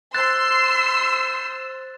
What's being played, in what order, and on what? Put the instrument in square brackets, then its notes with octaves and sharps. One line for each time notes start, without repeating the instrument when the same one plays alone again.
[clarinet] C5 [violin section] C6 C7 [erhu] E6 [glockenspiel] F#6 A6